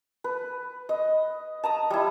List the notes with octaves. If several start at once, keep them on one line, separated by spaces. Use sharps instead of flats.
B4
D#5
A5 A#5 D#6
G3 E4